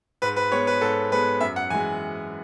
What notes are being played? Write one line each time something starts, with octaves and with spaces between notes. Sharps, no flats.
G#2 B4
B4
G#3 B3 C#5
B4
G#2 A4
G#3 B3 B4
F#2 E5
F#5
E3 G#3 G#5